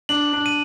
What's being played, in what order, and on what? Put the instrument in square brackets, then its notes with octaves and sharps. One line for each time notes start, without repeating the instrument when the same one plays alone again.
[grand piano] D4 [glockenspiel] F#7
[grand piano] D4
[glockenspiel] D#7